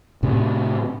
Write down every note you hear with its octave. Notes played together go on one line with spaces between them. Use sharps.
A2 C3 C4